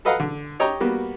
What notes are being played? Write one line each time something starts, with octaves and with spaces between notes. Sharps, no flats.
A4 B4 D#5 F5 F#5 A#5
D3
G4 C#5 D#5 G5 A#5
G3 A#3 B3 F#4